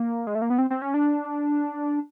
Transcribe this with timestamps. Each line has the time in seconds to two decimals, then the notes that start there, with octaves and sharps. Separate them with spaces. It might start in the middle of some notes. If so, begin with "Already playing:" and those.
Already playing: A#3
0.27 G#3
0.35 A3
0.42 A#3
0.50 B3
0.58 C4
0.70 C4
0.82 C#4
0.94 D4